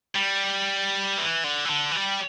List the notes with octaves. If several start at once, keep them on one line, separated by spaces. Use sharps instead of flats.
G3
E3
D3
E3
D3
E3
G3